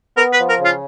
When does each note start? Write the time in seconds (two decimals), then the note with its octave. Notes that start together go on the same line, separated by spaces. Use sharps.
0.17 B3 A#4
0.33 B4
0.38 F3
0.49 A#4
0.59 C#3
0.65 F4